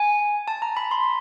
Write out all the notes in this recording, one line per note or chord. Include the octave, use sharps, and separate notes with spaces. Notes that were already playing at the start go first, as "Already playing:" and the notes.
Already playing: G#5
A5
A#5
B5
C6